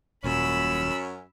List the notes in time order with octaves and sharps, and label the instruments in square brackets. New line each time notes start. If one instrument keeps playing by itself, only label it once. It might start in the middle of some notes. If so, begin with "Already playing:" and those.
[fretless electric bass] D#1 A#2 [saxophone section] F#2 C#4 [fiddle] B5 E6